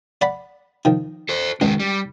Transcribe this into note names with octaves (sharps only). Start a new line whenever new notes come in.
D5 F#5 B5
D#3 F3
A4 C5
C#2 D#3 G#3
G3